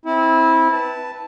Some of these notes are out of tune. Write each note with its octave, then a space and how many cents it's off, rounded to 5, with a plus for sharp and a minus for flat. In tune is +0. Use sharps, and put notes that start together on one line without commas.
C4 +0 E4 -20
B4 +0 A5 +0